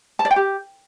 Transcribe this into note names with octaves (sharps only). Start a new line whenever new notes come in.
A5
D5
G5
G4